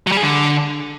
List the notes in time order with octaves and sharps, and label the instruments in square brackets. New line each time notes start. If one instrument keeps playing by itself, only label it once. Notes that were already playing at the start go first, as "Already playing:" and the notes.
[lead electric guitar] F#3
G3
G#4
D3